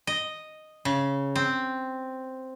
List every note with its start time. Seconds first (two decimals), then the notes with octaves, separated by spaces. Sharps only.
0.07 D#5
0.85 C#3
1.36 C4